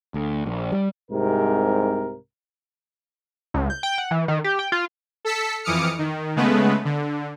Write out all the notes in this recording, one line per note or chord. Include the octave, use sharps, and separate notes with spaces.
D2
A#1
G3
C2 G#2 C3 A#4
C#2
G6
G5
F#5
E3
D#3
G4
G5
F4
A4 E6 B6 C#7
F2 E3 D6 D#6 F6 C#7
D#3
C#3 G#3 A3 B3 B4
D3